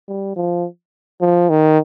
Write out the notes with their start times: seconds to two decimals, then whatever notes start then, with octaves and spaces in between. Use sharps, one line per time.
0.08 G3
0.36 F3
1.21 F3
1.49 D#3